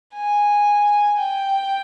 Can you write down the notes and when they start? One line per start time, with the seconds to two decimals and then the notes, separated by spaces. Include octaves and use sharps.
0.14 G#5
1.18 G5